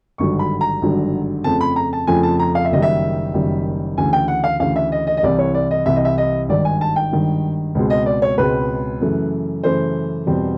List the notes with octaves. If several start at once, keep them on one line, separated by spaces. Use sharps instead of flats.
G#1 G2 D3 F#3 C#6
B5
A#5
G#1 G2 D3 F#3
F2 C#3 F3 A3 C4 A5
B5
A#5
A5
F2 C#3 F3 A3 C4 G#5
A5
A#5
F5
E5
F#1 F#2 D#3 G3 D#5
E5
F#1 F#2 D#3 G3
D2 C#3 E3 G#5
G5
F#5
F5
D2 C#3 E3 F5
E5
D#5
D#5
D#5
C2 C3 E3 D5
C#5
D5
D#5
C2 C3 E3 E5
D#5
E5
D#5
G#1 G2 D#3 D5
G#5
A5
G5
G#1 G2 D#3
C#2 B2 G#3 C4
D#5
D5
C#5
C#2 B2 G#3 C4 B4
F#2 C#3 E3 A3
F#2 C#3 E3 A3 C5
E2 B2 G3 C4